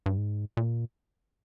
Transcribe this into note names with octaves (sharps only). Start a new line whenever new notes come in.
G2
G#2
A#2